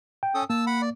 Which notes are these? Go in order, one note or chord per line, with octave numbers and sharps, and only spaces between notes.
G5
C#4 A4 D#6
A#3 A5 E6
F#5 B5
D5